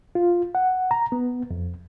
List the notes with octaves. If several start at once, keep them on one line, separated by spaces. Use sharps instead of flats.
F4
F#5
A#5
B3
F2